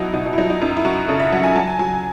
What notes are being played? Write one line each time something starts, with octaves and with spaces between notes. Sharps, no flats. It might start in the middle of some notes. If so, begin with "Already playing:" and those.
Already playing: B2 F#3 D#4 E4
B2 D#4
D#4
E4
F#3 D#4
D#4
F#2 D#4
E4
F#2 F#4
C#3 A4
E5
F#3 F#5
G#5
F#3 A5
G#5
F#3 G#5